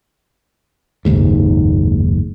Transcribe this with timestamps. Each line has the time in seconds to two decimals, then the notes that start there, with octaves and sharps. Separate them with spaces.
1.05 F#1 D#2 G#2